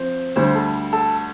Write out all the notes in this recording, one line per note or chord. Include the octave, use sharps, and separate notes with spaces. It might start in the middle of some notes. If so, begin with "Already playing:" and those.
Already playing: F3 C4 C5
D2 D3 G3 C5
A4
A4